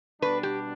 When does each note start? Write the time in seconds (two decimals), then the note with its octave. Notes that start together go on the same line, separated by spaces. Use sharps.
0.22 B2 G3 B3 D4 B4
0.43 G4